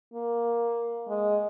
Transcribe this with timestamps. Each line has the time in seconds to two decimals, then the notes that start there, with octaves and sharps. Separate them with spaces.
0.14 A#3
1.08 G#3